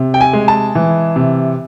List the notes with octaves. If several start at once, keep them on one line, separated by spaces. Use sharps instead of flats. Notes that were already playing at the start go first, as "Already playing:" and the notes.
Already playing: C3
G5
G#5
G#3
A5
E3
C3